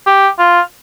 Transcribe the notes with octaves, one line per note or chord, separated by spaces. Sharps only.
G4
F4